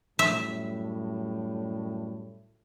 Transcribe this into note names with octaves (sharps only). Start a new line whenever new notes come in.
F#2 A2 G3 E5